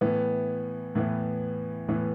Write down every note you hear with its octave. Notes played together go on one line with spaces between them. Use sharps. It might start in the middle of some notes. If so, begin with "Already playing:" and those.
A2 E3 B3
A2 E3 B3
A2 E3 B3